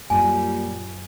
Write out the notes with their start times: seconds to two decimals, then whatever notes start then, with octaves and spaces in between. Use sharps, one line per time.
0.10 F#2 A#2 G3 G#5 C6